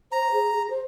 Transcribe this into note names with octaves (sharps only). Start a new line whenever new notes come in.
C5 A#5
G#4
G#4
C5